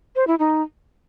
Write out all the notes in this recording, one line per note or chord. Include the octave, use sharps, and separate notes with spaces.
C5
E4
D#4